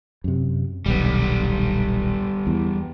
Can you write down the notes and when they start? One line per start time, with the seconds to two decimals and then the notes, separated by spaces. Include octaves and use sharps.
0.24 F#2 C3
0.86 D#1 B1 G3 B3
2.47 E2